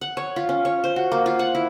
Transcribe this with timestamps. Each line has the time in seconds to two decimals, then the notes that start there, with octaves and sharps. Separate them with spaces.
0.01 F#5
0.17 C#5
0.36 F4
0.49 C#4
0.65 C#5
0.84 C5
0.96 F#4
1.12 A#3
1.26 F4
1.39 F#5
1.55 E4